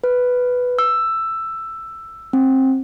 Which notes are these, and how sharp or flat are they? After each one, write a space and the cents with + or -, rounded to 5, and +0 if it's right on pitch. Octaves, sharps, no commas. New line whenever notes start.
B4 +5
E6 +10
C4 +20